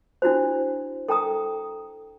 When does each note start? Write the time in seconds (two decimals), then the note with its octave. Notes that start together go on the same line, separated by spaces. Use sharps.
0.22 D4 E4 F#4 C5
1.08 A4 G5 A#5 D#6